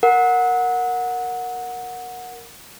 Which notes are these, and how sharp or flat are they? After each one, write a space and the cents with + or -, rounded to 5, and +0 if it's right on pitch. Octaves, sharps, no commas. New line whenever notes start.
A#4 +0 F#5 -15